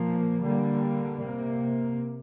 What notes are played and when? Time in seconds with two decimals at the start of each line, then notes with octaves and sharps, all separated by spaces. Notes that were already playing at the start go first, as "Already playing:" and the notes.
Already playing: A#2 F3 A#3
0.43 D3 G3 A#3
1.20 C3 A#3